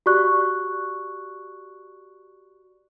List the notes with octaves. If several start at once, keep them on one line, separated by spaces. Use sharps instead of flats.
F#4 G4 D5 C#6 F#6